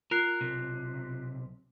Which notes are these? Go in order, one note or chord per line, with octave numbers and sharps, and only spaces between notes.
F4 A#4 F#6 C7
B1 C3